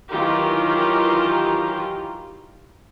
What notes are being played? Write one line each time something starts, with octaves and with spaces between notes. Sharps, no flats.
D#3 E3 F#3 F4 G4 A#4